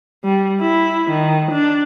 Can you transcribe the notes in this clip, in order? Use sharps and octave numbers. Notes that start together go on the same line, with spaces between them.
G3
E4
D#3
D4